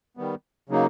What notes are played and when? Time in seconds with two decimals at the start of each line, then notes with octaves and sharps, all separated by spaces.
0.17 D#3 G3 B3
0.69 C#3 F#3 A#3 D#4